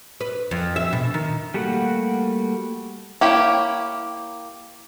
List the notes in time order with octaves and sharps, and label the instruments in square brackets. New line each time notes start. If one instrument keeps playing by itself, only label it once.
[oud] B4
F2
E5
B2
D#3
[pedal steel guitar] G3 A3 A#3 F#4 F#5
[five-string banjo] A#3 E4 G4 C#5 G5